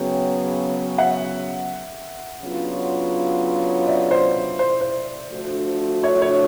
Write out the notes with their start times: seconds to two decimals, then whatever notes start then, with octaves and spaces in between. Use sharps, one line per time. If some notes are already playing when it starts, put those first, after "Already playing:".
Already playing: C#3 F#3 B3 G5
0.98 E5 F#5
2.42 C#3 F#3 B3 D4 F4
3.87 D5 E5
4.11 C5 D5
4.59 C5
4.81 C5
5.32 D3 F3 A3 D4 F#4
6.03 C#5
6.22 C#5